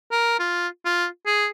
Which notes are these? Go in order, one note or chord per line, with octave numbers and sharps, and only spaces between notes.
A#4
F4
F4
G#4